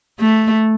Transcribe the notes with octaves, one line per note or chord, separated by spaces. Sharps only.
A3